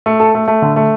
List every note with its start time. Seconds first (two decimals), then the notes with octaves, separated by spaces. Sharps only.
0.06 A3
0.20 A4
0.35 A3
0.48 A3
0.62 D3
0.76 A3